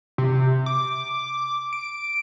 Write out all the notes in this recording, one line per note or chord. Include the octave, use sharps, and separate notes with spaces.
C3
D6
D7